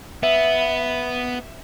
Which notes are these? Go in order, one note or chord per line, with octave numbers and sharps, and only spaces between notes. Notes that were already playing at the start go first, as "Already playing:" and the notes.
B3 E5